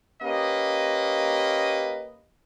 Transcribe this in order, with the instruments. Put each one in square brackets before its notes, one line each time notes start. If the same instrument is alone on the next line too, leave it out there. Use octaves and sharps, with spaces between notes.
[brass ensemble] A#3 C#4 G4 B4 D#5